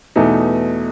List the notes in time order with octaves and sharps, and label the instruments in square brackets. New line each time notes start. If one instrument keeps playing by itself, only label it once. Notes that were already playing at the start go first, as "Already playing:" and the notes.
[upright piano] E2 B2 A3 D#4